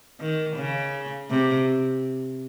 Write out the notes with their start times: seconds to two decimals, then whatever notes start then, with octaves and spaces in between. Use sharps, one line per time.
0.20 D#3
0.57 C#3
1.30 C3